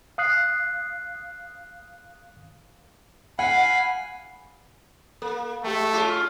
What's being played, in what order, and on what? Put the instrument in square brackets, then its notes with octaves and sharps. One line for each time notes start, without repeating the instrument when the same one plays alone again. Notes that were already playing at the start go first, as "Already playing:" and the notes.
[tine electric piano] F5 D#6 F#6 C7
[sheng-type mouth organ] F5 G#5 B5 [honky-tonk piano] F#5
[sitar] A#3 [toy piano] A4
[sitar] G#3 [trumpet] A3 [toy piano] G4 G5
[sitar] C#4 F4 [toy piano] F#4 G#4 A5